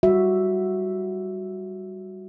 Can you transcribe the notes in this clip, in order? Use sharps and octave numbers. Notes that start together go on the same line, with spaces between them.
G3 F#4 E5